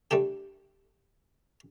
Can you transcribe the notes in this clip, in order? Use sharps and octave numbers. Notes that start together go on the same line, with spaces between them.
G3 A3 D4 G4